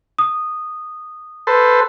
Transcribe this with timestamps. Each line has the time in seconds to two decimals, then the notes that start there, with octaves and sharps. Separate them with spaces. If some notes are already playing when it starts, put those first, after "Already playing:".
0.19 D#6
1.47 A4 B4 C5